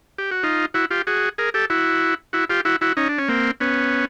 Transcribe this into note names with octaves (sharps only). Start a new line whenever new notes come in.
G4
F#4
D#4 F4
E4 F#4
F4 G4
F#4 G#4
G#4 A#4
G4 A4
E4 F#4
E4 F#4
F4 G4
E4 F#4
E4 F#4
C#4 D#4
D4
C#4
A#3 C4
B3 C#4